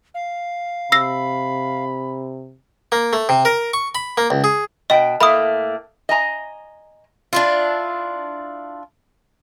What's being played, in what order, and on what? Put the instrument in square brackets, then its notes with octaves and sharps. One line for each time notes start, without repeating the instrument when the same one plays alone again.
[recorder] F5
[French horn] C3 [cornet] B5 [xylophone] E6 A#6 C7
[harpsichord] A#3
A3
C3
A#4
C#6
B5
A#3
C#2
G#4
[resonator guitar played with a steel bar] B2 G5 [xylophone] D#5
[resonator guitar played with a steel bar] A2 A3 A#3 [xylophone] B5 D#6
[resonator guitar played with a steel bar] D#5 G#5 A#5
[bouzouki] D4 E4 F4